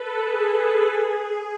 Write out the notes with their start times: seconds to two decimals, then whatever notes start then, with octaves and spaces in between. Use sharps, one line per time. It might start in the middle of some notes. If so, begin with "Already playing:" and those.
Already playing: A4 B4
0.24 G#4
0.89 G#4